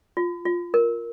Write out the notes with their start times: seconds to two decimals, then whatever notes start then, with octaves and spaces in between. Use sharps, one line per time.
0.17 F4
0.45 F4
0.74 A#4